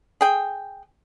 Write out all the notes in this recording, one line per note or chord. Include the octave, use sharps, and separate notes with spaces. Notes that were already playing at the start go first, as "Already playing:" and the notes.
G#4 G5